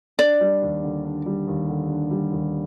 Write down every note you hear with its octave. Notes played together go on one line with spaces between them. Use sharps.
D4 D5
G3
D#2
D3
D4
G3
D#2
D3
D4
G3
D#2